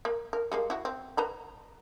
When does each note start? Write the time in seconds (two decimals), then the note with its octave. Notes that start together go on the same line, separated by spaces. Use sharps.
0.05 A#3
0.33 A#4
0.52 G3 G#3 A#3
0.70 E4 F#4
0.85 C4
1.17 B4 A#5 B5